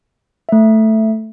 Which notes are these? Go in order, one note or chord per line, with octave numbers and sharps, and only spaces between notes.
A3 E5